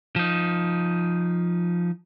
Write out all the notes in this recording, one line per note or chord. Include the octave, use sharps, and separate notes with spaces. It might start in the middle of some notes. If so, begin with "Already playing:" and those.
F3 D#4